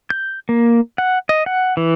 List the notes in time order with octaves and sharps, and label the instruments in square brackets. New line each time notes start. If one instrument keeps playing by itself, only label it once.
[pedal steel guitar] G6
A#3
F#5
D#5
F#5
E3